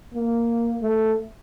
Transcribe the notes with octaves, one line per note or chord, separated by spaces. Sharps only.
A#3
A3